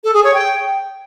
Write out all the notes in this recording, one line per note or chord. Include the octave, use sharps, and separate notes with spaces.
A4
G#4
C#5
G5